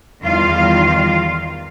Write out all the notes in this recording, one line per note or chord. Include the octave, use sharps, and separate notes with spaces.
E2 D#3 G3 F4 F5